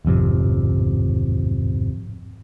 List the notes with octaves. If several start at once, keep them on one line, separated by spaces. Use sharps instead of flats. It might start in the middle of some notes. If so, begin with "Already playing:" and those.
D1 G#1 F2 C3